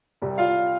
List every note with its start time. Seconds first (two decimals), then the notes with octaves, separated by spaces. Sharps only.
0.22 C2 C3 G3
0.38 F4 F5